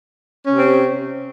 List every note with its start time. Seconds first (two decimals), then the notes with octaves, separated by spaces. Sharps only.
0.46 C#4
0.51 C3
0.56 C4